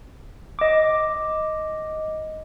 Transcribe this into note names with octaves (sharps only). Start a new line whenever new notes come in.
D#5 D6